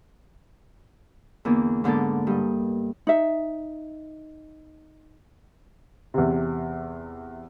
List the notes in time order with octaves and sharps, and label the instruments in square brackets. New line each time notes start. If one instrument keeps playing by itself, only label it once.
[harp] E2 D3 A#3 B3
G#2 D3 A#3 B3 A4
G2 D#5
[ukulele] D#4 E5
[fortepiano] E2 C3